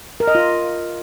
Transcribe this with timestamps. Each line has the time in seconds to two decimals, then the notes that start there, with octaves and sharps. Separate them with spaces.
0.20 A#4
0.28 D#5
0.35 F4